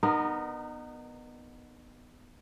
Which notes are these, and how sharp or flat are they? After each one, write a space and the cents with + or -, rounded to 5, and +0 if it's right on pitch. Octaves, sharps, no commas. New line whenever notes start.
B3 +0 D#4 -30 A#4 +5